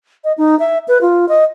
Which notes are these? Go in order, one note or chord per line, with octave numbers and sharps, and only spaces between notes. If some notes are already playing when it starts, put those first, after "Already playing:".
D#5
D#4
E5
B4
F4
D#5